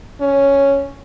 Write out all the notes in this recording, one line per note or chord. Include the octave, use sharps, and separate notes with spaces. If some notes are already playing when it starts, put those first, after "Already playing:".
C#4